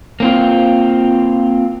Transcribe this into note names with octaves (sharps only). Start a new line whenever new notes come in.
A#3 C4 F4